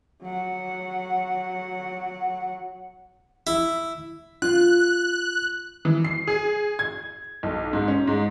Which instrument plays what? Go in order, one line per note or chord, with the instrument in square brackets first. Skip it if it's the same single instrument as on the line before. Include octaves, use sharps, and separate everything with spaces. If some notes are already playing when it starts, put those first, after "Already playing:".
[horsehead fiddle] F#3 F#5
[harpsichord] E4
[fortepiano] F4 [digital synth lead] F#6
[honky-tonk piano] E3
C7
G#4
G#6
B1
G#2
C#4
G#2